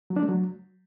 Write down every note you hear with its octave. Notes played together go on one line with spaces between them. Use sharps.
F#3
D4
A3
F#3